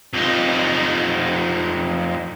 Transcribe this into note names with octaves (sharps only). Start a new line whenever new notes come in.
F2 D#4